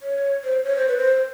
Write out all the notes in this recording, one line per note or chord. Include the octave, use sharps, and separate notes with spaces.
C#5
C5
C#5
C5
B4
C5